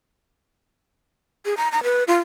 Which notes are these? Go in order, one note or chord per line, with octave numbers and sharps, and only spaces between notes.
G#4
A#5
A#5
B4
F4